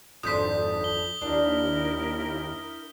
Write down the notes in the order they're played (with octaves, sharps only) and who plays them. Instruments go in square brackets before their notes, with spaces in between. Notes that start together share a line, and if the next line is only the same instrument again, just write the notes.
[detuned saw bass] G#1 [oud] F2 D4 C5 [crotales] D#6 G6 B6
[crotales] G7
[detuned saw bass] D#2 [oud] D4 [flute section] E4 A#4